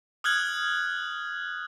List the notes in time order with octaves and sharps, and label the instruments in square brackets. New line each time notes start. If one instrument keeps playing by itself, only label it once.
[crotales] D#6 F6 F#6 G#6 F#7